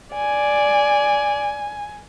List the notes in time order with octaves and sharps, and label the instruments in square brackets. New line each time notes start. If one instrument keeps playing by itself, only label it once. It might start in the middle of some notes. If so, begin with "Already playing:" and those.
[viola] D5 [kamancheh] G#5